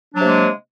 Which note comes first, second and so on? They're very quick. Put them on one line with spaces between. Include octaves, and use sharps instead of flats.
D4 F#3 C3 A#3 G#3